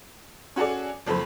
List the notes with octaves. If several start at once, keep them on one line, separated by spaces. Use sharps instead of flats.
C#4 F#4 G#4 A4 D5
F#1 F2 A4 C5 B5